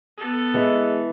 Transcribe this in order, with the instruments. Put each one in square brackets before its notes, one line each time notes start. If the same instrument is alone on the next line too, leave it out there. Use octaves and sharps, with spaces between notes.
[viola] B3 A4
[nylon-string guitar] E3 [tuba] G#3